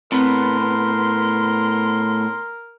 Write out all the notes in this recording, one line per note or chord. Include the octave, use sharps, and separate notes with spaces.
A2 B3 C4 A#4 C6